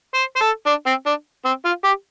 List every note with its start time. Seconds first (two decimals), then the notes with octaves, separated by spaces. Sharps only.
0.14 C5
0.36 C5
0.41 A4
0.67 D4
0.86 C4
1.06 D4
1.45 C4
1.65 F4
1.84 G4